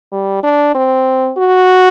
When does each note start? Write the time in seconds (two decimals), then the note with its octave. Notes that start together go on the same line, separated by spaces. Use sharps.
0.12 G3
0.43 D4
0.75 C4
1.38 F#4